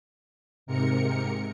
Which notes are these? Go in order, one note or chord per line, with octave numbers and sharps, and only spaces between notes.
G#2 C3 A#4 C#7